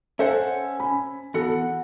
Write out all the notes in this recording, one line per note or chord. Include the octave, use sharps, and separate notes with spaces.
C#4 A4 C5 E5 F#5
G#5 B5
E2 F#4 A4 F#5 B5